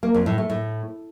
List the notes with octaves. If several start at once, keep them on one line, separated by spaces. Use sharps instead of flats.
A#3
F2
A2
A3
A2